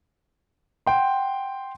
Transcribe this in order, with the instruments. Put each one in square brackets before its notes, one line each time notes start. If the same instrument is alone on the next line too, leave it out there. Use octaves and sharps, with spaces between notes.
[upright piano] F#5 G5 C6